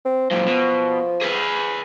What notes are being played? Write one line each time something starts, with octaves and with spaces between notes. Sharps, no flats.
C4
F#2 A#2 F3
B2
G#4 B4